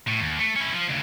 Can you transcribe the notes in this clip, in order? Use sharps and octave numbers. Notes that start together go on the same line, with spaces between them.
A2
D#2
A3
C#4 E4
F3
D2 C#3